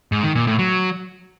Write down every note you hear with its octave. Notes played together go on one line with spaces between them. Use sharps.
G#2
D#3
A#2
A2
F#3